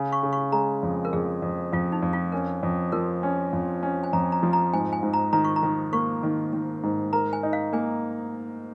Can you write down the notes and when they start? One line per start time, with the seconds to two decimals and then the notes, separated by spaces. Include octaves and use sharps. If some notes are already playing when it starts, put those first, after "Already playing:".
Already playing: C#3
0.12 C#6
0.23 C#3
0.33 C#6
0.52 G#3 A#5
0.83 F2
1.05 A#4
1.13 F2 G#4
1.42 F2
1.73 F2 F4
1.92 D#4
2.02 F2
2.13 F4
2.32 C#4 A#4
2.63 F2
2.92 F3 A#4
3.23 C#4
3.53 F2
3.83 C#4
4.03 G#5
4.13 F2 A#5
4.32 A#5
4.43 F3
4.53 A#5
4.73 G#2 G#5
4.93 G#5
5.03 G#2
5.14 A#5
5.33 D#3 A#5
5.45 C#6
5.56 A#5
5.63 D#3
5.93 A#3 C#6
6.23 D#3
6.53 D#3
6.83 G#2
7.13 A#4 A#5
7.33 G#5
7.43 D#4
7.53 F5
7.73 A#3 G#5